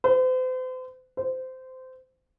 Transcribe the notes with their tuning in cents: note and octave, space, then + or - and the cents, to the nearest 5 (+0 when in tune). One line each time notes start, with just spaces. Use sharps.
C5 -40
C5 -20